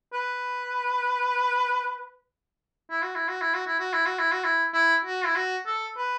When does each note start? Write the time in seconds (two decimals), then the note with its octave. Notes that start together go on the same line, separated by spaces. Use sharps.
0.13 B4
2.90 E4
3.02 F#4
3.15 E4
3.28 F#4
3.41 E4
3.54 F#4
3.67 E4
3.79 F#4
3.93 E4
4.06 F#4
4.19 E4
4.32 F#4
4.44 E4
4.74 E4
5.05 F#4
5.25 E4
5.35 F#4
5.66 A4
5.97 B4